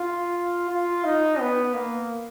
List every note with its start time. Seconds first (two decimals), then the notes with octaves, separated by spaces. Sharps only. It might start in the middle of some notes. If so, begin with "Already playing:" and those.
Already playing: F4
0.69 F4
1.04 D#4
1.40 B3
1.74 A#3